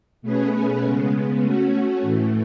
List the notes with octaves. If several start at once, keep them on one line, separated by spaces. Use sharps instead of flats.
B2 A3 C#4 G#4 B4
C#3 G#3 B3
A3 C#4 F#4
A2 E3 A3